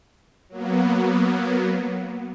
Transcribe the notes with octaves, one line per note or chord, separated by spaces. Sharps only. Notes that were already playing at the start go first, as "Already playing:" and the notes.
F#3 A#3 B3